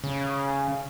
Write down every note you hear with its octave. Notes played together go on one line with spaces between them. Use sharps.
C#3